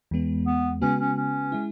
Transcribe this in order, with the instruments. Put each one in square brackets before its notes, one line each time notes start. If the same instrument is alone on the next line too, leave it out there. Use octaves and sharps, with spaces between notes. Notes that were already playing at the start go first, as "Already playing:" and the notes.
[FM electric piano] E2 E3 G#3 B3
[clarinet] B3
[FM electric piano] C#3 G#3 B3 F#4 B4 [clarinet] C#4
[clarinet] C#4
C#4
[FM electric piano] G#3 E4